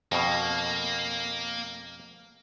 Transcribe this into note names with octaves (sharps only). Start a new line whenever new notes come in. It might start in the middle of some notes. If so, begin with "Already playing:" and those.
F2 B2 A#3